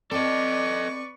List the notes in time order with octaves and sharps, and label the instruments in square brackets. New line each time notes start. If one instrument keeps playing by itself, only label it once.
[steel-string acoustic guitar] C4 A5 [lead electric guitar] A4 D#5 [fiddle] B4 C#6 [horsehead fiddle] D5